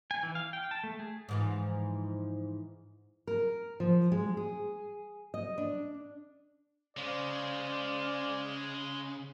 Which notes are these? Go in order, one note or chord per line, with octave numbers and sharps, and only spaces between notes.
G#5
E3
F5
G5
A5
A3
G#4
G#2 E3 F3
A#4
F3
G#3
G#4
D#5
D4
C#3 G#3 C5 D5 F5